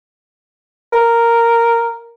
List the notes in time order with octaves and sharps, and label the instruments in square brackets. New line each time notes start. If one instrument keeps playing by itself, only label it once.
[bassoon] A#4